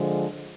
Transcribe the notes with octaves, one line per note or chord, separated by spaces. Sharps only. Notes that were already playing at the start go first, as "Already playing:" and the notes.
Already playing: D3 F3 G#3